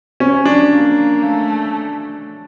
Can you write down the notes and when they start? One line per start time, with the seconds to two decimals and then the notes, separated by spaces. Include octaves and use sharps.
0.20 C#4
0.45 D4
0.71 A#3
1.22 A3